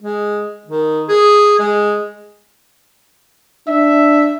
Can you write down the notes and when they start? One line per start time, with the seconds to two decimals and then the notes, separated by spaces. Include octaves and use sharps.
0.01 G#3
0.67 D#3
1.09 G#4
1.59 G#3
3.68 D4 E5